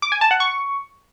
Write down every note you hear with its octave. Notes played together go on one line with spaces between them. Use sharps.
D6
G#5
A5
F#5
C#6